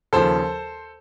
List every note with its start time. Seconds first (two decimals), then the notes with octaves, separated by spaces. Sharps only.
0.13 D#2 C#3 F3 A4 C5